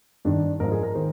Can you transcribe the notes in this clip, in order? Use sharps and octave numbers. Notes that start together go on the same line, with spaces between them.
G2 D#3 D4
G#2 F3 A#4
G#4
A#4
D#3 C5